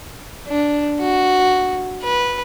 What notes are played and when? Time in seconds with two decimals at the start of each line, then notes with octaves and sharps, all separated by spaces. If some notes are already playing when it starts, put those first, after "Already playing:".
0.48 D4
1.00 F#4
2.03 B4